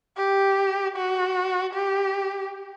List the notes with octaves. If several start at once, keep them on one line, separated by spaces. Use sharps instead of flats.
G4
F#4
G4